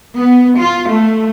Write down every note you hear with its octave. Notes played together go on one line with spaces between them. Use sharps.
B3
F4
A3